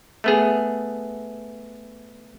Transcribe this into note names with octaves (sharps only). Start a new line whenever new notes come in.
A3 B3 G#4